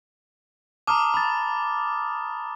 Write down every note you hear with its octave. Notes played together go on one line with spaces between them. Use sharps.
A5 A#5 D6 D#6 F6
B5 A6